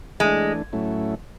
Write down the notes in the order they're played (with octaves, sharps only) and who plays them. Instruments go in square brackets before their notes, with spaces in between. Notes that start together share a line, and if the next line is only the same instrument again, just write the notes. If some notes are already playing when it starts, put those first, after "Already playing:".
[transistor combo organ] E3 A3 D4 [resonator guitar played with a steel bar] G#3
[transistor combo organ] A2 F#3 A3 C#4 E4